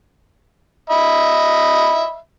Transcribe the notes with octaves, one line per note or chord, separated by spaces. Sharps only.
D#5 E5 B5